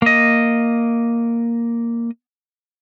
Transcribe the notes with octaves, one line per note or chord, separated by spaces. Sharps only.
A#3 D#5